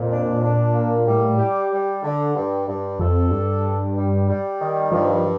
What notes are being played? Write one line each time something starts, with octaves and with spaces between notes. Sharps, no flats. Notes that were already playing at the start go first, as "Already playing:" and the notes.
Already playing: F2 A#2
D4
D4
A#3
A2 G3
G4
G3
D3
G2
G2
F2 A4
G2 D4
G3
G3
G3
D#3
G2 F3